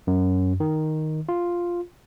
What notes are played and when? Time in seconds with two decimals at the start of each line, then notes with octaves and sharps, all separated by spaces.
0.07 F#2
0.60 D#3
1.29 F4